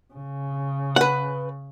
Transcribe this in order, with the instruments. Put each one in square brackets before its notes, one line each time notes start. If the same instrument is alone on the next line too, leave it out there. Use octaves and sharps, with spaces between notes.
[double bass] C#3
[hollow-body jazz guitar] B4 F#5